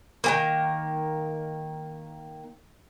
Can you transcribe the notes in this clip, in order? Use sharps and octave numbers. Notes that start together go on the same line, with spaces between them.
D#3 G#3 A#3